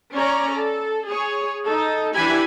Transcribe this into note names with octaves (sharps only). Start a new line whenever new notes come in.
C#4 C#5 D5 A#5
A4
G#4 C#5
D#4 A4
E3 D4 E4 G4 G#5 B5